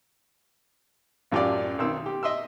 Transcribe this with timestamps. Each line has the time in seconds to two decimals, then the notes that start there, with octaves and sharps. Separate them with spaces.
1.32 A1 F#2 F4 G4 D5
1.78 B1 D#3 C4 E6
2.06 G4
2.23 D#5 E5 C6 E6